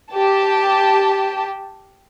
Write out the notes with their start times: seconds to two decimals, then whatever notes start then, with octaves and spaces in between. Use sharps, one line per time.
0.13 G4 A5